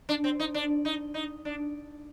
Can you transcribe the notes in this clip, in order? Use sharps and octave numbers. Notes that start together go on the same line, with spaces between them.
D4
C4
D#4
D4
D#4
D#4
D4